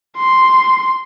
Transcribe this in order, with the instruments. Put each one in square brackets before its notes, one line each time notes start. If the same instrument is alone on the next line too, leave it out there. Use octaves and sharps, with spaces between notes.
[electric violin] C6